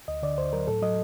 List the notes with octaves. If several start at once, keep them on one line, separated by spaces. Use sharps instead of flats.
D2 D#5
D3 D5
D2 C5
F#3 A#4
A2 A4
F#3 D#5